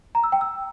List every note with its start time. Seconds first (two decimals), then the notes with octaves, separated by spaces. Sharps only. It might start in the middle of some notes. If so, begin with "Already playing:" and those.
0.15 A#5
0.24 E6
0.32 G5
0.41 E6